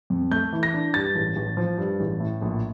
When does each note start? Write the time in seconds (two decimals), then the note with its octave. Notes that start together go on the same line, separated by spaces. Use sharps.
0.10 F2
0.31 A3 G6
0.53 E3
0.63 A#6
0.74 D4
0.94 G2 A6
1.15 A1
1.36 A1
1.57 F3
1.78 G2
2.00 A1
2.20 A2
2.42 A#1